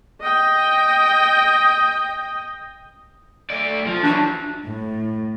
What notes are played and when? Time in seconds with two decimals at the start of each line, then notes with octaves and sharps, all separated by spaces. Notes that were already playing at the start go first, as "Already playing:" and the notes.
0.21 D#5 G5
3.50 A3 D5
3.87 F3
4.03 E3 F#3 D4
4.66 A2